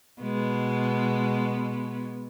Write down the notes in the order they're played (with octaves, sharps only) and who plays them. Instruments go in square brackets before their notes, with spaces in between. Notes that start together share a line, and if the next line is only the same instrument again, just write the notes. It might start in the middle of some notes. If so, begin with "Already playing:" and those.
[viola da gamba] B2 G#3 B3